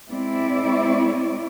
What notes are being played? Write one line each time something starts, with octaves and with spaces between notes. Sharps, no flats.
G#3 C4 E4 D5